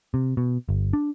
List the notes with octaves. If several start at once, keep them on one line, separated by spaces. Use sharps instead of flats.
C3
B2
G1
D4